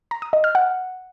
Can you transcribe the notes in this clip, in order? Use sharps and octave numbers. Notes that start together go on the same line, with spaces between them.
A#5
D#6
D#5
F6
F#5